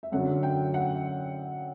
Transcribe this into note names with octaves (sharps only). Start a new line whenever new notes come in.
E5
F#2 D3 F#3 F#5
G5
F#5